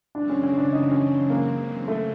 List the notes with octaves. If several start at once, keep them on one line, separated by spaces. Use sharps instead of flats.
F#2 C#3 E3 G#3 C4 D4
C#4
C#4
D4
D#4
C#4
A#3
A3